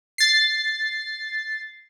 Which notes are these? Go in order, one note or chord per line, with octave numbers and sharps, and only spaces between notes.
A6 C7